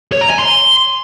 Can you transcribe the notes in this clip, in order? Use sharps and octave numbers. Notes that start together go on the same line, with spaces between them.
C#5
A#5
G#5
C6